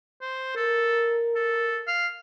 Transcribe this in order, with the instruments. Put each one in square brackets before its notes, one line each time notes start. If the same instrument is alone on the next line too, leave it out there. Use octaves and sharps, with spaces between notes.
[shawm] C5
[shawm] A4 [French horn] A#4
[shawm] A4
F5